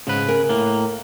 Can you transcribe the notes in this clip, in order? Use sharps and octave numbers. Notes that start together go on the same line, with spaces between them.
G#2 C#3 B4
A#4 G#5
A2 A#3